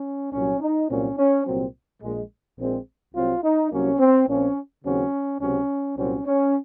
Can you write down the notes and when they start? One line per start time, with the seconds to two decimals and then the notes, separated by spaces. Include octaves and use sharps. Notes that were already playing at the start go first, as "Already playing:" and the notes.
Already playing: C#4
0.32 C2 A#2 F#3 C#4
0.60 D#4
0.89 C2 A#2 F#3 C4 C#4
1.17 C#4
1.46 C2 A#2 F#3 C4
2.01 A#1 A#2 G#3
2.58 A#1 A#2 G#3 C4
3.14 C2 C3 F#3 C4 F4
3.43 D#4
3.71 C2 C3 F#3 A#3 C#4
3.99 C4
4.28 A#1 A#2 F3 C4 C#4
4.84 D#2 C#3 F#3 C4 C#4
5.41 C#2 C3 F#3 C4 C#4
5.97 C2 A#2 F#3 C4 C#4
6.26 C#4